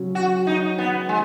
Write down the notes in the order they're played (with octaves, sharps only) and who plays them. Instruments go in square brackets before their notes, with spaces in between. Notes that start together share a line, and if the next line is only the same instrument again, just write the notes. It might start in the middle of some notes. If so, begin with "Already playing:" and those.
Already playing: [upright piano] C#3 F#3 C#4
[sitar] F#4
D#4
B3
G#3